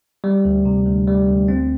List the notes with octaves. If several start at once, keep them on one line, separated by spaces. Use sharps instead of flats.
G3
D2
C3
D2
G3
D2
C4